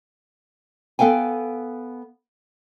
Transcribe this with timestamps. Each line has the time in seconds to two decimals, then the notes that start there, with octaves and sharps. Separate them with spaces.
0.99 B3 A4 F5 G5 G#5